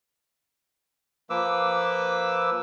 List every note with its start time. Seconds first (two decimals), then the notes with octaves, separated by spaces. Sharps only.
1.30 F3 A#3 B4 D6 E6